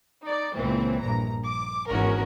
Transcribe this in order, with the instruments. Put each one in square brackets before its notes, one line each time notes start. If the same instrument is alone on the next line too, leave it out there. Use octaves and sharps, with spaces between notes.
[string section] D#4 D5
C#2 A#2 E3 C4
A#1 G2 A#5
D6
G#1 E2 G#2 C#4 F#4 A#4